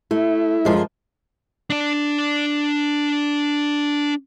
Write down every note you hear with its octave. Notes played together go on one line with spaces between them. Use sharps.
A3 E4
F#2 F3 G#3
D4 D5